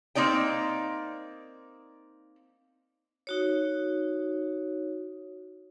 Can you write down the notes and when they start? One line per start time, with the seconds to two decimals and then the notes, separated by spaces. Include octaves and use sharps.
0.15 A#3 C4 D#4 D5 G5
3.27 D#4 F#4 C#5